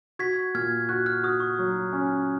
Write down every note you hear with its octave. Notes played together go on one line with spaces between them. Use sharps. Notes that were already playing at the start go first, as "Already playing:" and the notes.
F#4 G#6 B6
A#2 F6 G#6
F#4 F#6
F6
F#4 D#6
C#6
F#3
C#4